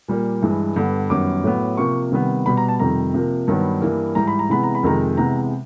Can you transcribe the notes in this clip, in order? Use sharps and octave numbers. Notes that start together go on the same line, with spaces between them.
A#2 G3 A#3
G2 E3 G#3
G2 D3 G3 B3
F#2 D#3 G3 B3 D6
A2 F#3 B3
C3 F3 A#3 C#6
C3 D#3 G3 B3
B2 G3 B3 B5
A#5
A5
F2 C3 D#3 G3 A#5
C3 F3 A#3
G2 D#3 F#3 B3
G2 E3 G3 A#3
G#2 E3 G3 A#5
B5
A#5
C3 E3 G#3 B3 B5
A#5
B5
F2 C3 D#3 G#3 A#5
C3 E3 G#3 B3 A#5